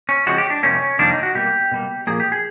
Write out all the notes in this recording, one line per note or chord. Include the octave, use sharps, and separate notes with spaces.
C#4
C#3 F3 G#3 C4 F#4
G4
D4
F2 C3 D#3 G3 A#3 C#4
F2 C3 D#3 G3 A#3 D4
D#4
F#4
B2 G3 A#3 G4
B2 G3 A#3
A#2 F3 A#3 G#4
G4
G#4